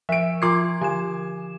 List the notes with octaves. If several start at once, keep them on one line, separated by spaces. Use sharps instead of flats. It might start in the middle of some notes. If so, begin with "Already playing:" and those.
F3 E5 D7
F3 F4 C6 D6 G#6 C7
D3 F3 G#5 E7